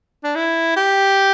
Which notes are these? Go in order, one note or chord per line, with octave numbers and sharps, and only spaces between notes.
D4
E4
G4